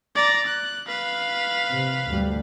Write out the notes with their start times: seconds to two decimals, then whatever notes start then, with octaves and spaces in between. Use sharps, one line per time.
0.15 D5 A#5
0.46 F#6
0.88 B4 F5
1.72 C3
2.07 D2 G2 G3